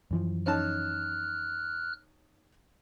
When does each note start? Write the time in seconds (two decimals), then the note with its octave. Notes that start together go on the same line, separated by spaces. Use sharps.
0.11 F#2 E3 F3
0.46 C#4 D#4 A5 F6 F#6